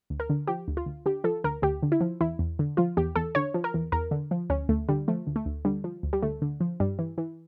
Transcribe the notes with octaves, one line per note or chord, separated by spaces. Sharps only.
D2
A#4
D3
F3 G4
D2
F4
D2
D3 G4
F3 A4
D2 A#4
D2 G4
D3
E4
F3
E2 E4
E2
D3
F3 F4
E2 G4
E2 A4
D3 C#5
F3
A#4
E2
E2 A#4
D3
F3
D2 C#4
D2 A3
D3 G3
F3 A3
D2
A3
D2
D3 G3
F3
D2
G3
D2 A3
D3
F3
G2 G3
E3
E3